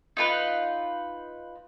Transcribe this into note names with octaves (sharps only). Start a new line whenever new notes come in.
D#4 F4 B4